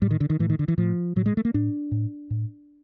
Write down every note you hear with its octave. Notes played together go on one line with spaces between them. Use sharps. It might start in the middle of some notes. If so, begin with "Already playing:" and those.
A2 G3
D#3
D3
D#3
A2 E3
D#3
D3
E3
A2 F3
A2 F#3
G#3
A3
A#3
A2 D4
A2
A2